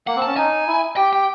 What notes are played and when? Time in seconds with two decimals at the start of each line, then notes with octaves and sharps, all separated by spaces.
0.07 A#3 F#5
0.16 C4
0.22 C#4 A5
0.37 D#4 G#5
0.68 E4
0.97 G4 G5
1.13 G5